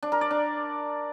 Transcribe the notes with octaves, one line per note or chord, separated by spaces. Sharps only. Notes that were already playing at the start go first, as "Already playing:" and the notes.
D4
A#4
D5
D4